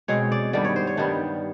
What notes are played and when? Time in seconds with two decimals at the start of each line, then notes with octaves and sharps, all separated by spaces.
0.08 B2 G#3 C4 C#5
0.32 D5
0.53 G2 D#3 G3 B3 D5
0.64 C#5
0.76 C5
0.87 C#5
0.97 G2 D#3 G3 B3